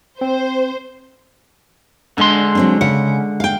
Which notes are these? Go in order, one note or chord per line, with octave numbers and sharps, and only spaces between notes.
C4 C5
D3 G#3 D4 C6
F#3 C4 D4
C#3 F#5
F5 G5